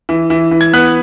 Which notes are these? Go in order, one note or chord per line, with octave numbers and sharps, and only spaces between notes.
E3
E3
E3
G#6
B3 F#6